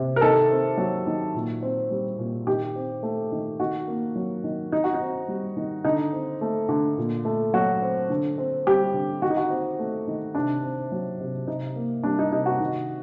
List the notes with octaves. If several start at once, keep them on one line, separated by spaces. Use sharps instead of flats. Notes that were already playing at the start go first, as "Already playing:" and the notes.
Already playing: C3
A#4
D#3 A4
C4
F#3
D#3
A#2
C4
G3
A#2
D#3 G4
C4
A3
D#3
D#3 F#4
A#3
F#3
D#3
D#3 D#4
F#4
D#4
C4
G3
D#3
D3 D#4
C4
A3
D3
A#2
A3
F#3 F#4
C4
D3
C4
G3 G4
D3
D#3 F#4
D#4
F#4
C4
A3
D#3
C3 D4
C4
F#3
C3
C3 D#4
A#3
G3 D4
D#4
C3 D#4
F#4
D#3